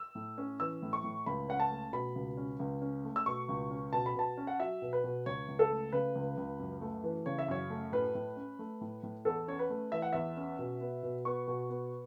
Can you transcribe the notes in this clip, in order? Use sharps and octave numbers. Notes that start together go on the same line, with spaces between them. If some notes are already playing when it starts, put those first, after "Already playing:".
Already playing: E6
A2
C#4
E3 E6
A2
C#6
A2
C#2 B5
C#4 F#5
A5
A3
B2 B5
C#2
C#4
C#2
C#4
A3
E6
B2 C#6
C#2
C#4
B2 A5
B5
B2 A5
C#4
F#5
F#3 E5
B2
B4
B2
C#2 C#5
C#2
A4
A3
C#3 B4
C#2
C#2
F#2
A3
E3
C#3 C#5
E5
F#2 C#5
A3
A2 B4
A2
C#4
A3
A2
A2
E2 A4
C#4 C#5
B4
A3
E3 E5
F#5
E2 E5
C#4
B2
B3
B2
B3 C#6
B2
B3